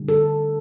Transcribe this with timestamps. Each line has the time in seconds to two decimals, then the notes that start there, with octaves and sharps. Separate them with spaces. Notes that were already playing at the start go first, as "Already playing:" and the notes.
Already playing: D3 G3
0.08 A4